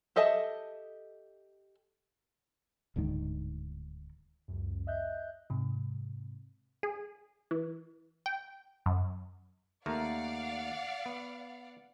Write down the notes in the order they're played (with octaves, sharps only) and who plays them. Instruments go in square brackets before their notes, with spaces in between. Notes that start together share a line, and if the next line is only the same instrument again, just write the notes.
[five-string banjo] G4 A4 D#5 E5 A5
[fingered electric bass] D1 D2 G#2 D#3
[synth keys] C#2 F#2
D#5 E5 F#6 G6
[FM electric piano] G#2 C3
[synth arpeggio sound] G#4
E3
G5
F#2
[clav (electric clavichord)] D#2 A3 A#4 [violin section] D5 F5 F#5
[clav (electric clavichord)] B3